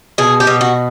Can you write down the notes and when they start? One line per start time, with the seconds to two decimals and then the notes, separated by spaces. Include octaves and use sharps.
0.18 B2 G#4
0.40 G4
0.47 B2
0.61 F#4